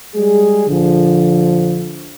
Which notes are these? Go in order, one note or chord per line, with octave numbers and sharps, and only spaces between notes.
G3 G#3 G#4
A#1 D3 F3